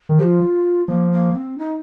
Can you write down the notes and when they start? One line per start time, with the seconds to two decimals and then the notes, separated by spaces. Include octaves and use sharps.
0.09 D#3
0.19 F3 F4 G4
0.88 F3 A#3
1.12 A#3
1.35 C4
1.58 D#4